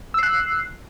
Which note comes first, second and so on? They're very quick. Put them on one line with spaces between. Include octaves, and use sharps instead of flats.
E6 C7 F#6